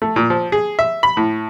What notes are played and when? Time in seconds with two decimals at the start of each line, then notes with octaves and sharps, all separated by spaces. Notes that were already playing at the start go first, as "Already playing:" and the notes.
0.02 A3
0.16 A#2
0.30 F3
0.52 G#4
0.79 E5
1.03 B5
1.17 A2